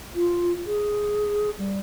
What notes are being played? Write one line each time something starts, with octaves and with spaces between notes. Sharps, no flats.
F4
G#4
G3